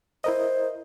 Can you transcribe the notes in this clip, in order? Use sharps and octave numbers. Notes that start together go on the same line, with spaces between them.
E4 A#4 C5 D#5